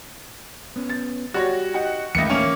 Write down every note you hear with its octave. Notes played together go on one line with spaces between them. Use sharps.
B3 C#4
A6
G3 F#4 C#5 D5 A#6
D#4 G4 F#5
C#2 D#3 E3 A3 E4 A#6 C#7
A#3 C#4